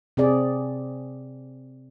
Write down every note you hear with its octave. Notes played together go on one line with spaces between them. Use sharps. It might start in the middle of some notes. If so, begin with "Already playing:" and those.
C3 C4 G#4 D5